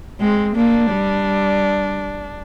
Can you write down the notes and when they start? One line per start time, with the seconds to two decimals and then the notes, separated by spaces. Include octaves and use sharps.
0.20 G#3 C4
0.56 A#3 D4
0.92 G3